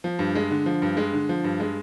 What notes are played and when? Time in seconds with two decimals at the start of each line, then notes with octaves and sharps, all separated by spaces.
0.04 F3
0.19 G2
0.35 G#3
0.51 D3
0.66 F3
0.82 G2
0.97 G#3
1.13 D3
1.29 F3
1.44 G2
1.60 G#3